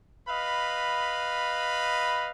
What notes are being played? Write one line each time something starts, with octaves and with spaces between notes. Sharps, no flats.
B4 D#5 F5 B5